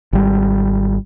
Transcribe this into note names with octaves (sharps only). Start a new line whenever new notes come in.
G#1 G3